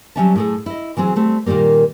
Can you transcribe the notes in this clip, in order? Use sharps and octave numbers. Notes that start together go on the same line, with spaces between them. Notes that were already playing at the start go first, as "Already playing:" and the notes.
F#3 G3 A#3 C#4 E5 A5
A2 G#4 A4
E4 D#5
E3 F#3 C4 G#4
G3 A3 C4
A#2 D#3 F3 G3 A#3